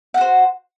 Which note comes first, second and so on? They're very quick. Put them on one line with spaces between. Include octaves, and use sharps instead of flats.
F#5 F#4 C5